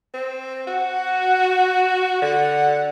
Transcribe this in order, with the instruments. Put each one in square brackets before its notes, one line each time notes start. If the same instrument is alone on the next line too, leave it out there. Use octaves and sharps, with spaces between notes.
[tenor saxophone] C4
[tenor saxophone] F#4 [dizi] F#5
[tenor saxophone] D3 [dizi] F#5